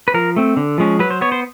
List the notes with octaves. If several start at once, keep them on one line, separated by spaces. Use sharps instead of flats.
B4
F3 A#4
A3 C4
D3
F3 G#3 C#4
F#3 B4
C5
B3 C#5
C5